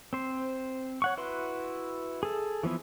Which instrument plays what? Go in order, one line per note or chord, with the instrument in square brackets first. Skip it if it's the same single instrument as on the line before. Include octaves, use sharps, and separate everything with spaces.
[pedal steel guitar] C4 C5
C#5 F#5 C#6
E4 F#4 B4 C6
G#4 A4
E3 F3 B3 E4